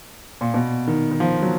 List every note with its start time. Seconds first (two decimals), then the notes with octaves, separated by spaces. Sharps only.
0.41 A#2
0.54 B2
0.87 D#3
1.11 D#3
1.20 F3
1.42 F#3